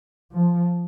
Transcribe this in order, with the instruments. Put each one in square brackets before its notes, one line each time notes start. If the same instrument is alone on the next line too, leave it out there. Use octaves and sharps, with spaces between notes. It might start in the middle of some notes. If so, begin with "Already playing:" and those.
[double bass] F3